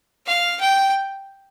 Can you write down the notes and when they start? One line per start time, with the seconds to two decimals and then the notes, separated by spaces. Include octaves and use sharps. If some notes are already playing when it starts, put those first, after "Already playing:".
0.27 F5
0.61 G5